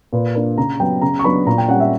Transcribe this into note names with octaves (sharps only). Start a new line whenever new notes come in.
A#2 B4
A#3 D4
C#3 A#5
F#3 B3 G5
C#3 A#5
C#6
F#3 B3 D4 B5
A#2 A#5
G5
G3 C#4 F#5
E5